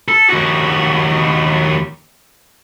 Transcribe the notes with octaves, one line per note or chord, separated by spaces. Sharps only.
A4
D#2 F#4